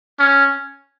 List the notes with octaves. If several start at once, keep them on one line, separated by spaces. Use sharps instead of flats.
C#4